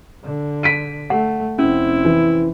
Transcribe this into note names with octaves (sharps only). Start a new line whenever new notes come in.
D3
B6 D7 D#7
A3 F#5
F1 C4 C#4 E4
E3